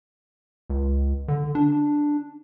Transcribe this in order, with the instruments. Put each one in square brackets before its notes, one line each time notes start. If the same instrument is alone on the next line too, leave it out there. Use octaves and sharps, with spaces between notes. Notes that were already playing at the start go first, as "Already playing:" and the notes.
[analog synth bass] C#2
D3
D4